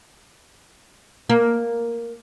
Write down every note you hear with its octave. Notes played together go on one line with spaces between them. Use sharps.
A#3